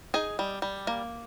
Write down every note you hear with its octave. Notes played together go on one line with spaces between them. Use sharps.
D#4 G#4 G#5
G3
G3
A#3